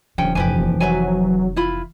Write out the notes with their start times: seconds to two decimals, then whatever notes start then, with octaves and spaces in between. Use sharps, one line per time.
0.18 D#1 D3 F3 C#4 G5
0.35 F1 E3 F3 G4 B4 G#5
0.80 F#3 B4 E5 G#5
1.56 E4 F4 B5